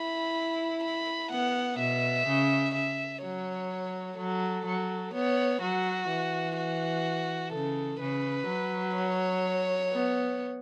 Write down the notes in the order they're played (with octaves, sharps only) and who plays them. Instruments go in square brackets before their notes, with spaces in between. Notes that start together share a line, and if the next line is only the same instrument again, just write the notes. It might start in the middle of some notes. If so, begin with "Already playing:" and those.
Already playing: [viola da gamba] E4 [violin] B5
[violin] B5
[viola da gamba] B3 [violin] F#5
[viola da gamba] B2 [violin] E5
[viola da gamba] C#3
[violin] E5
[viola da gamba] F#3 [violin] C#5
[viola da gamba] F#3 [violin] A4
[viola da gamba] F#3
[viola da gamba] B3 [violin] C#5
[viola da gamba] F#3 [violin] F#4
[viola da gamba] E3
[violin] F#4
[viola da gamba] C#3 [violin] A4
[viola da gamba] C#3 [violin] B4
[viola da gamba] F#3
[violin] C#5
[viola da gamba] B3